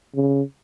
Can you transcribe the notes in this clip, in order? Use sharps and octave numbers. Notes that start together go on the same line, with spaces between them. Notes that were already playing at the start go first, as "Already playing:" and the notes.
C#3